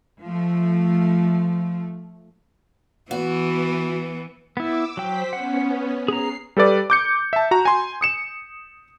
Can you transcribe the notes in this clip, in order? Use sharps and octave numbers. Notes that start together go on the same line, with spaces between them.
F3 A3
E3 B3 F#4
B3 E4 D6 E6
F#3 C5 G5 B6
B3 C#4 F#5
G#4 A#5 C7
G3 A4 B4 D5
D6 G6 C#7
E5 A5
F#4 A#5
G#5 C6
D#6 C#7 E7